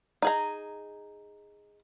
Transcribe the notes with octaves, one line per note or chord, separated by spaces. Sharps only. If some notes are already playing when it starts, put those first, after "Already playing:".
D#4 G#4 A#5